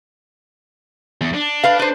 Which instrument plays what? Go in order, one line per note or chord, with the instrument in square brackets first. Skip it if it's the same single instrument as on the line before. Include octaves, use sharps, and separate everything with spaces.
[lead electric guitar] E2
D4
[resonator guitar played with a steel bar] B4 F5
B4 C5